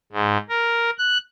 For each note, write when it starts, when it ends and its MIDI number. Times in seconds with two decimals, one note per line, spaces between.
0.12 0.37 44
0.49 0.90 70
0.98 1.18 90